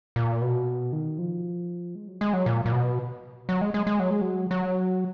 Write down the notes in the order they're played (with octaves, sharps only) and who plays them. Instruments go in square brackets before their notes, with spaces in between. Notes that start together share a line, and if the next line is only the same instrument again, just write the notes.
[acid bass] A#2
B2
D#3
F3
G#3
F#3
G#3
F#3
A#2
A#2
B2
F#3
G#3
G#3
G#3
F#3
G#3
F#3
F#3